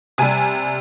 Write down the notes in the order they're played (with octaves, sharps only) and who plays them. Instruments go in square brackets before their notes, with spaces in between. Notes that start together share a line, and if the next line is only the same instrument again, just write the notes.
[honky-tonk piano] C3 G3 G#5